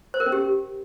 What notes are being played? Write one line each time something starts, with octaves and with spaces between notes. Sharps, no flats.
C5
A#4
C#4
G4